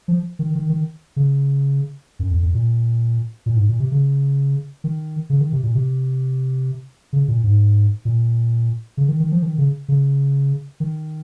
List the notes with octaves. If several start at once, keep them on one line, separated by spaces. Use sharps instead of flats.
F3
D#3
D#3
D#3
C#3
F#2
F2
F2
A#2
A#2
G#2
A#2
C3
C#3
D#3
C#3
D#3
C3
A#2
C3
C#3
A#2
G#2
A#2
C#3
D#3
D#3
F3
D#3
C#3
C#3
D#3